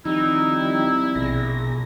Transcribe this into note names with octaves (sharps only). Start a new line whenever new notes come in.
D#3 F3 G3 C4 D#4 E4
A#1 B2 G#4 A#6